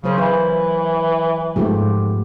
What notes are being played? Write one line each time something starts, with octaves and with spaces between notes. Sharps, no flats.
C#3 F#3 A#4 C5
E3 B4
G#2 F3 A3 B3 F4 G4